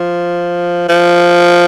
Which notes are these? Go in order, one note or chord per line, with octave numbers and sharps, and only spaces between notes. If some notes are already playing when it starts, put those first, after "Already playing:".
Already playing: F3
F3